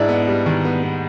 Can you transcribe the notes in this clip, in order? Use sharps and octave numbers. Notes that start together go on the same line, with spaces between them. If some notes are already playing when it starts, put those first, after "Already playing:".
Already playing: G#2 D4 E4
B3
G3
D#3
B3
B3